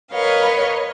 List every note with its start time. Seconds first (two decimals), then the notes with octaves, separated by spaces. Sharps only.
0.12 A#4 B4 C#5 D#5 F5